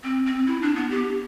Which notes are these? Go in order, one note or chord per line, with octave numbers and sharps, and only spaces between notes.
C4
C4
E4
D4
B3
G4